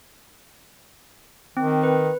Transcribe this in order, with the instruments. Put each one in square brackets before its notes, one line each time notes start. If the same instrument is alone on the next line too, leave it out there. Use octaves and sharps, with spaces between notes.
[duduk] D#3 [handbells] C4
[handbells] B4